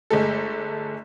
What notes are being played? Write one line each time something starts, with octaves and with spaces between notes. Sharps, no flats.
G1 G#3 A3 A4